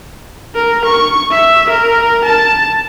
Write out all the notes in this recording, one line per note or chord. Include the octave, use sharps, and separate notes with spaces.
A#4
C#6
E5
A#4
A5